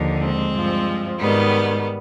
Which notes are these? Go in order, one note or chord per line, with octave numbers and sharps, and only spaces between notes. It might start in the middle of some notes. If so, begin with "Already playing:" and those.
Already playing: D#2 D3 F3
G#3 C4
G2 F3
G#2 D#3 G3 B3